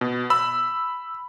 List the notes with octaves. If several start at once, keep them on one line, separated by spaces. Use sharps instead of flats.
B2
B5 E6